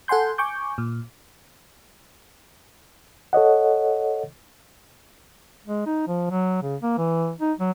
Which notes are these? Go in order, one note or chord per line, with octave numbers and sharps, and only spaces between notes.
A4 F#5 G#5 C6 G6
G#5 C#6 D6 G6
A#2
A4 C#5 D#5 F#5
G#3
D#4
F3
F#3
C#3
A#3
E3
D#4
F#3